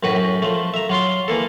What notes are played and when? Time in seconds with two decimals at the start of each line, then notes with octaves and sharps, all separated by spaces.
0.03 F#2 A2 F#4 B4
0.15 F#2
0.42 F3 A3
0.74 E5 A#5
0.89 F#3 F4 C6
1.28 E3 A#3 A4